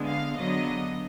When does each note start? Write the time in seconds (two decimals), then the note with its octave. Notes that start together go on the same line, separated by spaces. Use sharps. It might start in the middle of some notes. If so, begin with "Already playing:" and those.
Already playing: D3 G#3 B3
0.08 F5
0.37 D3 F#3 B3 D#5